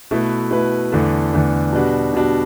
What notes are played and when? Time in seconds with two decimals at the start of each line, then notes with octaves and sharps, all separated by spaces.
0.11 B2 A3 E4 B4
0.51 B2 A3 E4 B4
0.92 E2 D3 A3
1.33 E2 D3 A3
1.73 B2 G3 D4 F#4
2.14 B2 G3 D4 F#4